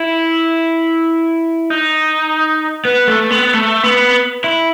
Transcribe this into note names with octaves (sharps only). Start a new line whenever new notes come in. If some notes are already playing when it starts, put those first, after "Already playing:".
Already playing: E4
D#4
B3
A3
B3
A3
B3
E4